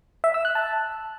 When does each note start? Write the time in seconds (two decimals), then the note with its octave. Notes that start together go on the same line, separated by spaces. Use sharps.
0.24 E5
0.34 E6
0.45 F#6
0.55 A5